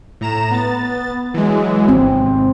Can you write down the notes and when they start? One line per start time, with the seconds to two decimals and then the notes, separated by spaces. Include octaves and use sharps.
0.21 A2 A#5 E7
0.51 B3 A6
1.34 E3 F#3 G#3
1.88 G#1 C4